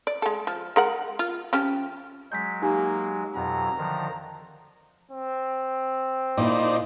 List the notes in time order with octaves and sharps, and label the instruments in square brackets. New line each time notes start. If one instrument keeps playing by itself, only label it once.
[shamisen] D5
G#3 A4
F3
G#3 A#4 F#5
F4
F3 C#4 G4
[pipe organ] F#3 G#3 [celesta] G6 B6
[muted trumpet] A#3 [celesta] D#4 G4 G#5
[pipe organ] F2 B2 F#3 [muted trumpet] A#5
[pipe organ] D3 D#3 F3
[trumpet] C4
[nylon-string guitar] A#2 A#3 E4 [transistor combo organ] D#4 C5 D5 [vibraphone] D#5